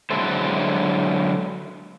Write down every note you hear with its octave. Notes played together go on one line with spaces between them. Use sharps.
D3 F#3 G#3 E4 A4 C5